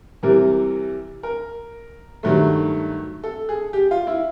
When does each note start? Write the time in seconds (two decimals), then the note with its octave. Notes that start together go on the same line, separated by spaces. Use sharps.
0.23 C3 E3 G3 A#4
1.23 A#4
2.23 G2 D#3 F#3 A3
3.24 A4
3.49 G#4
3.73 G4
3.91 F4
4.07 E4